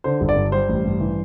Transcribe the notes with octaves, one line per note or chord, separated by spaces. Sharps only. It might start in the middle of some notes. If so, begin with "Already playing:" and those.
D3 C5
G1
D5
G2
G3 C5
A1
G2
E3